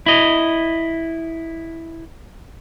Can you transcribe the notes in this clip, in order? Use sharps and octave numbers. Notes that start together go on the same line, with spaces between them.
E4 D#5